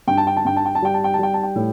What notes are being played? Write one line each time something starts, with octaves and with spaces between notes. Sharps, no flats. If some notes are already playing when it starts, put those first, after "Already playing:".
G2 G5
A5
G5
A5
G2 G5
A5
G5
A5
G3 G5
A5
G5
A5
G3 G5
A5
G5
A2